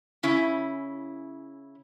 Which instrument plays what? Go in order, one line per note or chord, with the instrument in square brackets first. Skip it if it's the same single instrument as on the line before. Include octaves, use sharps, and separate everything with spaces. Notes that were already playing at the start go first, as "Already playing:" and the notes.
[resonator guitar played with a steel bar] C#3 C#4 E4